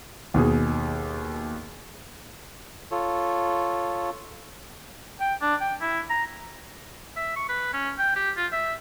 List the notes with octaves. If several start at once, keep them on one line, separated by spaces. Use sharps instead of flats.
D#2 B2 G#4
F4 A4 C#5
G5
D4
G5
E4
A#5
E5
C#6
B4
C#4
G5
G4
F4
E5